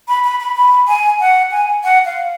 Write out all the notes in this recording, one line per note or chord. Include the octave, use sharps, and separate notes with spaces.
B5
B5
B5
B5
G#5
F#5
G#5
F#5
F5